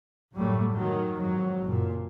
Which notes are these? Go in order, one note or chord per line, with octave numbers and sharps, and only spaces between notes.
G1 F#2 A2 F#3 G3 A3
D#3 F#3
F2 G#2 F#3
F#1 A#2